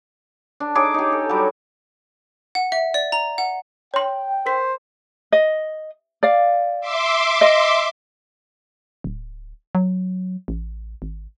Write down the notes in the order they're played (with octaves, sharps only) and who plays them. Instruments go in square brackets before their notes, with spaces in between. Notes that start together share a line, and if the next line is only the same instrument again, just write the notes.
[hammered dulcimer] D4
D#4 G#4 C#5 D6
D#4 G4
A4
F#3 G3
[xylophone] F#5
E5
D5
A#5
F#5
[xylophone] C#5 C6 [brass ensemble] G5
[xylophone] A#4 B6 [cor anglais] C5
[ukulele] D#5
D5 F5
[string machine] E5 C6 D6
[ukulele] D#5
[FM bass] D1
F#3
A1
G#1